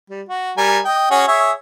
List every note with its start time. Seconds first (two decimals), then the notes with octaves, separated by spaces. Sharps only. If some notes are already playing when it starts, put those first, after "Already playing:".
0.10 G3
0.29 F#4
0.57 G3 A#4 G#5
0.85 D#5 G5
1.11 C#4 F#4 G#4
1.28 G#4 C#5 E5